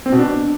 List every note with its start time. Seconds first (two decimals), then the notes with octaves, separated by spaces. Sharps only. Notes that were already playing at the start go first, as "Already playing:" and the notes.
0.06 C4
0.12 B2
0.19 D4